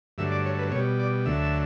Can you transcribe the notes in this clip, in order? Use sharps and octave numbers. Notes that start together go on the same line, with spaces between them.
G2 D3 F#3 A3 E5
D5
C#5
B4
B2 G3 C#5
D5
D2 D3 F#3 A3 E5